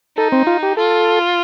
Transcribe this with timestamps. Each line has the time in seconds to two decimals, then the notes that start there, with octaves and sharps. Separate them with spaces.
0.17 D#4 A4
0.32 C4
0.47 F4
0.63 G4
0.77 F4 A4